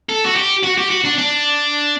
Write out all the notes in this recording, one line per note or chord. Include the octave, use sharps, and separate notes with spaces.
A4
F#4
G4
F#4
G4
F#4
D4
D4